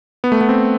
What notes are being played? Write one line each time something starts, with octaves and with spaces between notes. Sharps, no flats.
B3
A3
B3
C4